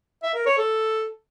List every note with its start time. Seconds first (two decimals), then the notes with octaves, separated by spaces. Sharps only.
0.23 E5
0.35 A#4
0.46 C#5
0.58 A4